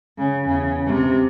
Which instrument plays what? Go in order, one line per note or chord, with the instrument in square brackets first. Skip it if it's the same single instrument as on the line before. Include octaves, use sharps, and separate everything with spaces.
[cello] C#3
E2 C#3
C3